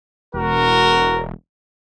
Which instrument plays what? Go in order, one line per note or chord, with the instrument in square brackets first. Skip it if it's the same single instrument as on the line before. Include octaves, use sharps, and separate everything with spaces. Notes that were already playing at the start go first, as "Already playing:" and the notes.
[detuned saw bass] E1 [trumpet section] F#4 A#4